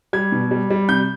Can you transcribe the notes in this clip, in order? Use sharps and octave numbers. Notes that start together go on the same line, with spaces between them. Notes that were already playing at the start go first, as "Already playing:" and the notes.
G3 G#6
B2
G3
G3
C3 G6